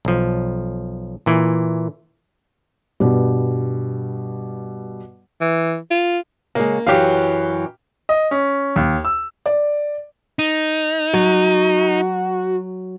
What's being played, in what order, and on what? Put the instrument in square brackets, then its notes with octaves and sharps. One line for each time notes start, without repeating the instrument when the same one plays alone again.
[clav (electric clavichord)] B1 F3
A#2 E3
[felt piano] G2 B2 G3
[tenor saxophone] E3
F4
[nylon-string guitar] C#3 G#3 [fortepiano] A#3
[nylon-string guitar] F#2 E3 F#3 [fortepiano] G4 F5
[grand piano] D#5
C#4
D#2
E6
[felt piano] D5
[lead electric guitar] D#4
[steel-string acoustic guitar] F#3 [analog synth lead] F#4